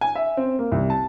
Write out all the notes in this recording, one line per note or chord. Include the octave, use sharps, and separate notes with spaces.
G#5
E5
C4
A#3
C2
A5